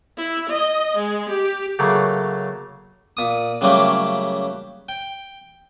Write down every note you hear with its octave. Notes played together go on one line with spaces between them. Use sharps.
E4
D#5
G#3
G4
C#3 F#3 A3 A#3
A#2 D#6
C#3 F#3 G3 A3 A#3 G4
G5